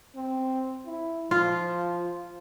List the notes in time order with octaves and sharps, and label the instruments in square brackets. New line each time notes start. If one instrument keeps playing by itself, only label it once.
[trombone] C4
E4
[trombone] F3 [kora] F4